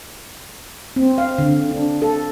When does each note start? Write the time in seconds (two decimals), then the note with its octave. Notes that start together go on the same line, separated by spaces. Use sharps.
0.96 C4
1.18 F5
1.38 D3
1.71 D4
2.02 A4